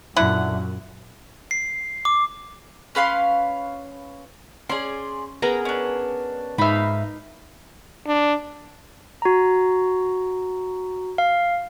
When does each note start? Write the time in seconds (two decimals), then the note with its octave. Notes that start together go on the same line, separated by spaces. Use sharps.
0.16 F#2 A#2 D3 E4 F#5
1.51 C7
2.05 D6
2.95 C#4 B4 F5 C6
4.69 C#4 G#4 D5 C6
5.42 B3 G#4 A#4 A#5
5.65 C#4 D4
6.58 G#2 D#4 E5 F5 B5
8.07 D4
9.22 F#4 A#5
11.18 F5